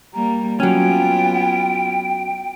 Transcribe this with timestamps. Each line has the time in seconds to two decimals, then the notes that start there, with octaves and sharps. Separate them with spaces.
0.14 G3 A#3 A#5
0.60 F#3 B3 C#4 F4 G5